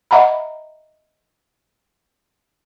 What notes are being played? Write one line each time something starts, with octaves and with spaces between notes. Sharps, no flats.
D#5 E5 F#5 A#5 B5